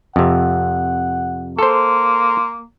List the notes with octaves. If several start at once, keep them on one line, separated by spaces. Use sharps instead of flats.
F2 C3 F#5
A#3 A4 C5 C6